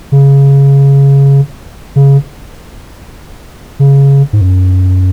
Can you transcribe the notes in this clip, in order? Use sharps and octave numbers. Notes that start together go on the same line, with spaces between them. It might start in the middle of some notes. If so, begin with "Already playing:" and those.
C#3
C#3
C#3
G#2
F#2